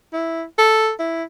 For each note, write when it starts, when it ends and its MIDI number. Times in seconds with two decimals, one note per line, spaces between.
0.13 0.43 64
0.58 0.91 69
1.00 1.23 64